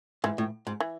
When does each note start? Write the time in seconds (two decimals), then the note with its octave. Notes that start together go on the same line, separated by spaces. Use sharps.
0.24 G#2 E3
0.38 A2
0.67 G#2
0.80 E3